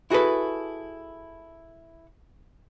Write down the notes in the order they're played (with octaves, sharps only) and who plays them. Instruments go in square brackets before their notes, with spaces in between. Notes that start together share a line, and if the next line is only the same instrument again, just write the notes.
[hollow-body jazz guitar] E4 F#4 G#4 A4 B4